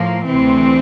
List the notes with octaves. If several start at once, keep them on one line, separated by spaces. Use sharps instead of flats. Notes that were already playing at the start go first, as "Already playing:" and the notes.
Already playing: A2 F3 A#3
D2 C3 E3 C4